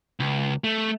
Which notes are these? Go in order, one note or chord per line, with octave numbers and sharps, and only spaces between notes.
C#2
A3